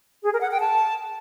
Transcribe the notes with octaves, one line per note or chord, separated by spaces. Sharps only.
G#4
A#4
F#5
G5
A5